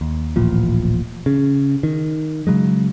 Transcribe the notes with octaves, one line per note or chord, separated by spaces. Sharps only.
D#2
D1 A1 A#2 F3
C#3
D#3
C#3 E3 F#3 G#3